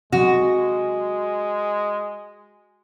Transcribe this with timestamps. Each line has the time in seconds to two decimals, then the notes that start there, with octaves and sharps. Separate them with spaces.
0.12 C3 F#3 G#3 F#4